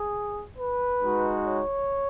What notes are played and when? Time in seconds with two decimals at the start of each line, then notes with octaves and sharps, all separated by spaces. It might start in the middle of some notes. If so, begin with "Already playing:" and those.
Already playing: G#4
0.58 B4
1.02 G#3 D#4 F#4
1.46 C#5